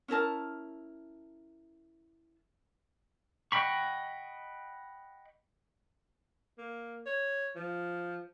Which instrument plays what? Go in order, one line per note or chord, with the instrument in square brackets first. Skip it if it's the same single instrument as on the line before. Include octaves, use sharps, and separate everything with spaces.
[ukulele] C#4 E4 A#4 A5
[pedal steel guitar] D#5 F#5 G5 B5 C#6
[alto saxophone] A#3
C#5
F3